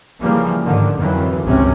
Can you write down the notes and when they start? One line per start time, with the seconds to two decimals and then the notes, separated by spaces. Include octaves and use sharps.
0.22 C#3 E3 F3 G3 A#3
0.65 G#2 D3 D#3
0.97 F2 D#3 E3 F#3
1.44 G#1 C#2 C3 F#3 C4 C#4